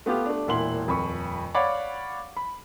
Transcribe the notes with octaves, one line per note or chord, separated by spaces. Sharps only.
A3 B3 F4 G4
A3 D4
E1 A#2 E4 F#5 C6 F#7
D#1 F2 B5 C#6
C#5 D5 F5 F#5 B5
B5